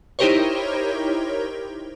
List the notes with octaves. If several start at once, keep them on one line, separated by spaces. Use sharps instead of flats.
D#4 E4 G4 A#4 C5 C#5